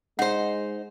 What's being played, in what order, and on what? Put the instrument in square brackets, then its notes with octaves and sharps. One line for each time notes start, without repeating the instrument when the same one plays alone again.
[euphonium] G#3 [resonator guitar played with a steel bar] D#4 C5 [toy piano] F#5